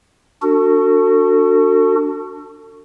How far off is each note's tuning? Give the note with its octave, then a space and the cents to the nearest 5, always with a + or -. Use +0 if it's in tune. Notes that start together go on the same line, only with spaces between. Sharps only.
D4 +0 F#4 +0 A4 +40